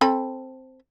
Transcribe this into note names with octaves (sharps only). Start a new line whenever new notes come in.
C4 A4 B5